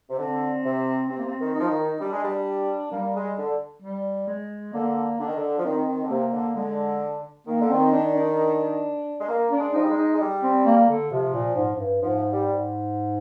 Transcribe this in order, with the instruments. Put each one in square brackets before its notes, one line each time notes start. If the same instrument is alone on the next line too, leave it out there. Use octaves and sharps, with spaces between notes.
[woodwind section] C3
[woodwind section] D3 [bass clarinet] C4
[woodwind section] C3
[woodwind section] C3 [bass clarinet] C4
[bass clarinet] A#3
C4
[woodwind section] D#3
[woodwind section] F3 [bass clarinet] D#4
[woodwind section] D#3
[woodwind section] G3 [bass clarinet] D4
[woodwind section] G#3
G3
[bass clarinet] G3 [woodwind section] A#3
[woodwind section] G#3
D3
[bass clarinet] G3
G#3
[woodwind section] D3 [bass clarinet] A#3
[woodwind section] D3 [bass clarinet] D4
[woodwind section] D#3
D3
F3
[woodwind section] D#3 [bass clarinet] C4
[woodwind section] D#3
D3
[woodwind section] C3 [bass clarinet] A#3
[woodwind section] D3
[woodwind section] D3 [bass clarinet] G#3
[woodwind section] D#3 [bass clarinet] A#3
[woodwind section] D3
[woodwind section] D#3 [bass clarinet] C4
[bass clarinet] D4
D4
[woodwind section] G#3
A#3
[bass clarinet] D4
[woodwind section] G#3
[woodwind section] F3 [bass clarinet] D#4
[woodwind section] G3
G#3
[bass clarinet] D#4
[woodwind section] G#3
G3
[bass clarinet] C4
A#3
D3
[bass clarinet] C3 [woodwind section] F3
[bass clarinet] A#2
G#2
G#2
G2
[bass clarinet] G#2 [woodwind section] F3
[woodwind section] G3
[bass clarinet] G#2